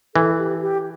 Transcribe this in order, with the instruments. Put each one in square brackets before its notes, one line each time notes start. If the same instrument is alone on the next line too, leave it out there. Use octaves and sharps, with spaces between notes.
[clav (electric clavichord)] E3 [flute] A4
[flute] G4
G4